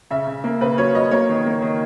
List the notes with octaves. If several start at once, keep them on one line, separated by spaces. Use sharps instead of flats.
C#3 E5
C#3
A#3
C#3 B4
F#3 C#5
F#3 D#5
A#3 C#5
D#3
A#3
D#3